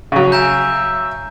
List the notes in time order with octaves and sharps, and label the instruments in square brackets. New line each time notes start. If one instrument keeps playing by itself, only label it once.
[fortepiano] C#3 F#3 [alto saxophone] G#4
[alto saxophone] E5 [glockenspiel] G#5 A#5 G6